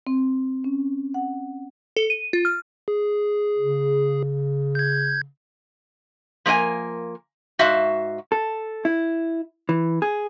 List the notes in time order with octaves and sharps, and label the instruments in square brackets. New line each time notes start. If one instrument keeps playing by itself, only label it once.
[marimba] C4
C#4
F#5
[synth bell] A4
D#7
F4
F6
[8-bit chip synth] G#4
[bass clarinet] C#3
[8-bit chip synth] G6 G#6
[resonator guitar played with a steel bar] F3 A#3 A#4 D#5 G#5
G#2 F#4 E5 F5
[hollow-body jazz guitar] A4
E4
E3
G#4